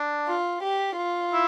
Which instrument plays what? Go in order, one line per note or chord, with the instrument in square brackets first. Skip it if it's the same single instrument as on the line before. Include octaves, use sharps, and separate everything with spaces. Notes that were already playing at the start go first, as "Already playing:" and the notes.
Already playing: [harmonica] D4
[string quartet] F4
G4
F4
[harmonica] E4